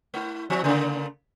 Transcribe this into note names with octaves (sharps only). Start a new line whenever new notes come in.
A3 E4
F3 C4 E5
C#3 A3 A#3